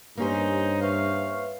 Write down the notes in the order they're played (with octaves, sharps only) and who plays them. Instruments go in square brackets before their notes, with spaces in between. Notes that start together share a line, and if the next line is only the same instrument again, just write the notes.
[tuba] G2 [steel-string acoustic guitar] A#3 C#4 C5 [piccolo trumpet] D#4 [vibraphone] G4
[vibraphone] B4 E5 C#6 [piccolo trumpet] F5